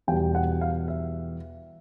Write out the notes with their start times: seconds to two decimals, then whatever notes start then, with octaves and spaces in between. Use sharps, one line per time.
0.07 E2 B2 G3 G5
0.35 F#5
0.61 F5
0.88 E5